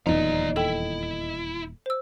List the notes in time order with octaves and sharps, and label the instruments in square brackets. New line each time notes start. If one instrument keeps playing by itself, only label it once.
[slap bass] D#1 E2 F3 [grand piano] D#4 [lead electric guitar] D5 A#5
[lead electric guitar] E4 [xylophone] A4 G5
[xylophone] C5 E6